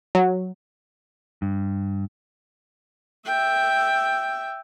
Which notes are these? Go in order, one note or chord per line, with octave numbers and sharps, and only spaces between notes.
F#3
G2
E5 G5